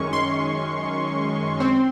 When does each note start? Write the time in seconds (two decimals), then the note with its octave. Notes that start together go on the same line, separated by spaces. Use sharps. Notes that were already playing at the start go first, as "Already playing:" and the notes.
Already playing: F#2 D#3 G#3 C#4 C#6
0.13 C6
1.60 C4